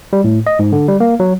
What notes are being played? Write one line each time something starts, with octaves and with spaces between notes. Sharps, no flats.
G3
A2
D#5
G#2
D3
G3
A#3
F#3